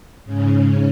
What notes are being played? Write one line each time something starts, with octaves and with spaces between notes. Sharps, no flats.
G#2 C#3 C#4